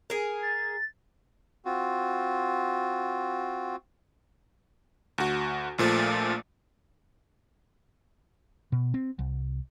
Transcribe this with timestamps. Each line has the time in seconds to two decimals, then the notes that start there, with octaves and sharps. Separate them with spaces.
0.10 G#4 A#4
0.42 A6
1.65 C4 F4 F#4
5.18 D2 F#4
5.78 A#1 A#2 F3 A3
8.72 B2
8.94 C4
9.19 C2